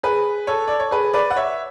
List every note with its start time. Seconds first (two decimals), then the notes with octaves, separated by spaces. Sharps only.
0.03 G#4 B4
0.47 A4 C#5
0.68 D5
0.80 C#5
0.91 G#4 B4
1.13 B4 D5
1.30 F#5
1.36 C#5 E5